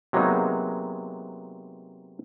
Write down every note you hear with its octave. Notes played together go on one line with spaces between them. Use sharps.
C3 F#3 G#3 A#3 B3 D#4